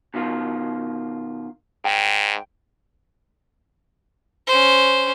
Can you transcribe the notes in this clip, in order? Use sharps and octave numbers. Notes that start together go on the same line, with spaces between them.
B2 D#3 F4
G#2 G5
C#4 C5